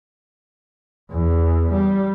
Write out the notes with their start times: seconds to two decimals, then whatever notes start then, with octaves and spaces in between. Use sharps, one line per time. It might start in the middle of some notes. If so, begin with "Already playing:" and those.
1.12 E2
1.72 G3